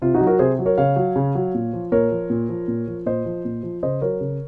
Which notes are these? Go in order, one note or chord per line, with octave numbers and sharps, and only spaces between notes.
C3 F4
D#4 F#4
F#3
F#4 A#4
C3 G#4 C5
F#3
A#4 C#5
C#3 C#5 F5
F#3
C#3
F#3
A#2
F3
A#2 A#4 C#5
F3
A#2
F3
A#2
F3
A#2 C5 D#5
F3
A#2
F3
C#3 C5 D#5
F#3 A#4 C#5
C#3